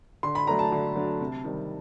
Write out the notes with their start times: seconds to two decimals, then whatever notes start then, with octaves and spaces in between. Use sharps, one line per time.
0.23 D3 C6
0.35 B5
0.47 F#3 A3 D4 A#5
0.59 A5
0.72 D3
0.96 F#3 A3 D4
1.20 C3
1.44 D#3 G3 C4